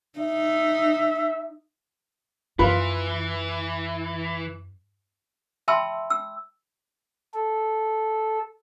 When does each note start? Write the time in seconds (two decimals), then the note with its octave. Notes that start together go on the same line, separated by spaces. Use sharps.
0.19 D#4 E5
2.59 F#2 E3 F4 B4
5.68 E5 G5 A5 B5 C6 E6
6.10 E6
7.34 A4